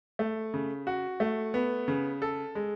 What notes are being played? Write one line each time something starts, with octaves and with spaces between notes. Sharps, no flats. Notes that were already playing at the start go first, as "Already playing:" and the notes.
A3
C#3
F#4
A3
B3
C#3
A4
G#3